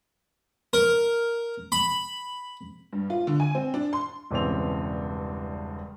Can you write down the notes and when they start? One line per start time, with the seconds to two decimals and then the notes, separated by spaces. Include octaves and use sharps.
0.73 A#4
1.72 B5
2.93 G2
3.10 F4
3.27 D3
3.40 G#5
3.55 C4
3.74 D4
3.93 C6
4.30 E1 G2 C#3 E3 C4 F7